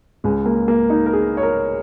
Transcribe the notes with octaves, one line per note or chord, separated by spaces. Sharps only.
C#2 C#3 G#3
A#3
A#3
D#4
A#4
G#4
C#5
A#4